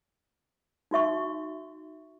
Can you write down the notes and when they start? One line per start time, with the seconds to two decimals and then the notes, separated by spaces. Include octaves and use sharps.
0.91 D#4 F#4 E5 C#6